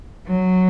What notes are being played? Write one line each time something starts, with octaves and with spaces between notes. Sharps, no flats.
F#3